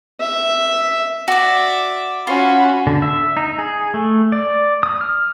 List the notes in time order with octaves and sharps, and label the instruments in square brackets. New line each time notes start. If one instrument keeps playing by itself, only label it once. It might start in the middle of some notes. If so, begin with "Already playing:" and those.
[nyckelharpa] E5
[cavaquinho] F#4 D5 [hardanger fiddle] E5 D6
[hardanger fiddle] C#4 [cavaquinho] F4 [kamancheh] F#4 B5
[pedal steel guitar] D3
E5
D#4
G#4
A3
D5
D#6
F6